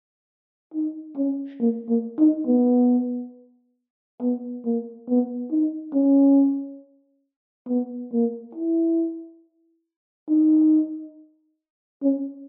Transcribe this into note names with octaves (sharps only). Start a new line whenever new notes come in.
D#4
C#4
A#3
A#3
D#4
B3
B3
A#3
B3
D#4
C#4
B3
A#3
E4
D#4
C#4